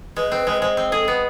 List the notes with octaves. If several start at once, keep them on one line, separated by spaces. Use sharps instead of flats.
G#3 B4
C4
G#3
G#3 C5
C4 C5
G#4 A4
B3 B4